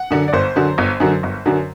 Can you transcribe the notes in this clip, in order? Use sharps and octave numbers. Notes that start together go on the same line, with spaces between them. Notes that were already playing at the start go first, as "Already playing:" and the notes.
Already playing: F#5
F#2 D3 F#3
D5
G1 C5
F#2 D3 F#3
G1
F#2 D3 F#3
G1
F#2 D3 F#3